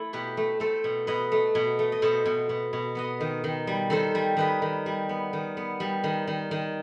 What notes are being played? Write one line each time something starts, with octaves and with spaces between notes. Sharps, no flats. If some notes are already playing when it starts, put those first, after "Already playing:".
Already playing: A3 E4 A4
B2 G4 B4
A3
A3 A4 C5
B2
B2 B4 D#5
A3
B2
A3
D#5
B2 A4 C5
B2
B2
B2
B3 B4 D#5
D#3
D#3
G3
D#3 A4 C5
G3
D#3 B4 D#5
D#3
G3
B3
D#3
B3
G3
D#3
D#3
D#3